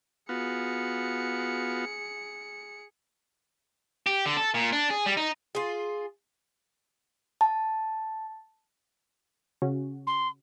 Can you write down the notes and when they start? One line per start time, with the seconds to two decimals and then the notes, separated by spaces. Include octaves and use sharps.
0.29 B3 F4 F#4 G#4 C#7
4.06 G4
4.26 D3
4.37 A4
4.54 A#2
4.72 D4
4.90 G#4
5.06 G3
5.17 D#4
5.55 F4 G#4
7.41 A5
9.62 C#3 C#4 F#4
10.07 C6